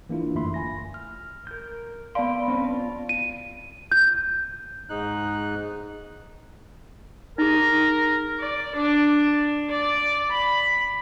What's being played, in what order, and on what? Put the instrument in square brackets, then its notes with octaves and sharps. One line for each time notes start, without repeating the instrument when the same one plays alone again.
[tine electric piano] E3 A#3 D4 E4 F4
G1 F#2 A3 E5 B5 C6
G#5 A#6
[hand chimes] F6
[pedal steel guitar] A#4 G6
[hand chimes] B3 A5 D7 [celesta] D5 F5 [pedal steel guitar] B5 C6
[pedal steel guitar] C4 C#4 B4
F4
[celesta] D#7
G6
[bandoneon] G#2 D#4 F#6
[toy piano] D#4 G#4 [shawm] A#4
[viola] D5
D4
D5
B5